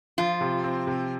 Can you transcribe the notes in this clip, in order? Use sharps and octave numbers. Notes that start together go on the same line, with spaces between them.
F3 F4
C3
C4
C3